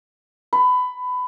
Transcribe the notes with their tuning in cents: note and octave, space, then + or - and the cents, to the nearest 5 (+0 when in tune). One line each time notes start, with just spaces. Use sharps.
B5 +20